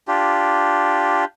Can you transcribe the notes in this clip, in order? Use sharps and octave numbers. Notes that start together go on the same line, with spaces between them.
D4 F4 G4